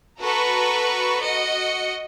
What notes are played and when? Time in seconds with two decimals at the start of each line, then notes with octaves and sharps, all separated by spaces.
0.20 F#4 A4 B4 A#5 C#6
1.21 F#4 D#5 C#7